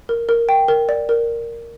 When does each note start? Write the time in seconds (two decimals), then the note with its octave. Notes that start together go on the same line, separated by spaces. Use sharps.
0.09 A#4
0.29 A#4
0.49 G5
0.68 A#4
0.89 D5
1.09 A#4